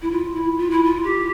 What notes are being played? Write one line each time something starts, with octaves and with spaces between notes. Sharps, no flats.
E4
F4
E4
F4
E4
F4
G4